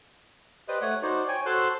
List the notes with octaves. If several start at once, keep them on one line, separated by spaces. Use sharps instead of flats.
G4 B4 C5 D5 D#5
A3 C#5 F#5
D#4 F#4 C5 D5
C#5 G5 G#5
F#4 A4 C5 A5 C6 F#6